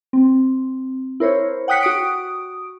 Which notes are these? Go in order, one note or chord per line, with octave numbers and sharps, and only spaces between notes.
C4
E4 A#4 C5 C#5
F#5 G5 D#6 F#6 B6 C#7
F#4 D#6 D7